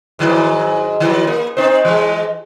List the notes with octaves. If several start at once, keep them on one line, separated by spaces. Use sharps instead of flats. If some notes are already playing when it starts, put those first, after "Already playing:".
G#2 D#3 F#3
D#3 F#3
A#3
C4 D#4 C5
E3 G#3